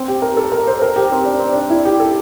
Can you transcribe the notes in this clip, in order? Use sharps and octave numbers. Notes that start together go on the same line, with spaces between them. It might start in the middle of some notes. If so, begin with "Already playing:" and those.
Already playing: C4
G4
A#4
A4
A#4
C5
A#4
G4
C4
D4
C4
D4
E4
G4
A4